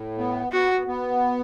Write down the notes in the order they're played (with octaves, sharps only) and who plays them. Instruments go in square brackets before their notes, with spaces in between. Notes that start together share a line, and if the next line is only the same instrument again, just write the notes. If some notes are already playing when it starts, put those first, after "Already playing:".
Already playing: [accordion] A2
B3
[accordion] B3 [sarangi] F#4
[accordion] B3